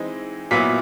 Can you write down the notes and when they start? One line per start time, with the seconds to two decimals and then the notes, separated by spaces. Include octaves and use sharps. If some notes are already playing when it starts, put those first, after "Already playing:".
Already playing: E3 G#3 C4 D#4
0.51 A#2 F#3 B3 E4 B6